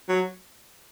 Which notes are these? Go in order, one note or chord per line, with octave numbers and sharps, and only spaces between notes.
F#3